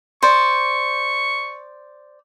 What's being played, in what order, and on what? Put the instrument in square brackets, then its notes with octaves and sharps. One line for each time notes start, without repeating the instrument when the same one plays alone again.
[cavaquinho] C5 D5 [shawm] C#6